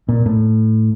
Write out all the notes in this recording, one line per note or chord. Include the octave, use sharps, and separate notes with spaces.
A#2
A2